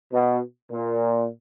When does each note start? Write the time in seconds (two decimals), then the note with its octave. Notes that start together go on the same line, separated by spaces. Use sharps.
0.13 B2
0.72 A#2